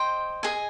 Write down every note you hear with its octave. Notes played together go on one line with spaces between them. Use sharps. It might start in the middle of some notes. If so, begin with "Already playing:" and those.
Already playing: C5 D#5 G5
G#4 D#5 G#5